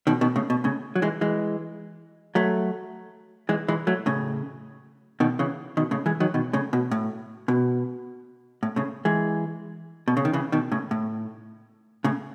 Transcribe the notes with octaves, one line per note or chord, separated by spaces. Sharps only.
B2 D#3
B2 D#3
A2 C#3
B2
A2 C#3
F#3
E3 G#3
E3 G#3
F#3 A3
E3 G#3
E3 G#3
F#3 A3
A2 C#3
B2 D#3
C#3 E3
B2 D#3
A2 C#3
E3 G#3
D#3 F#3
B2 D#3
A2 C#3
B2
A2
B2
A2
A2 C#3
E3 G#3
B2
C#3
D#3
C#3 E3
B2 D#3
A2 C#3
A2
A2 C#3